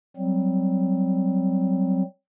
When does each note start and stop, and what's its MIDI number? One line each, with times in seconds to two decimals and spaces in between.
0.17 2.03 54
0.17 2.03 55
0.17 2.03 60